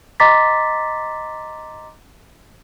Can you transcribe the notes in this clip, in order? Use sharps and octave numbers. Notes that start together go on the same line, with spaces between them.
D#5 A#5 C6 D6 A6 B6